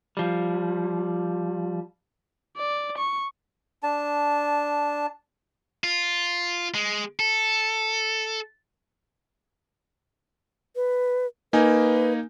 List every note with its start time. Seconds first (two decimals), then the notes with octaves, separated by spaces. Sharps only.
0.17 F3 G3
2.57 D5
2.98 C#6
3.83 D4 A5
5.84 F4
6.74 G#3
7.20 A4
10.76 B4
11.53 A#3 D#4 B4 G#5